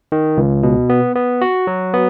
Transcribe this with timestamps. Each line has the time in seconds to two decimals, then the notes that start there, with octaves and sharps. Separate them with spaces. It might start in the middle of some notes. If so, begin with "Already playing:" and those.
0.12 D#3
0.37 C#2
0.63 B2
0.90 B3
1.15 B3
1.41 F#4
1.67 F#3
1.94 B3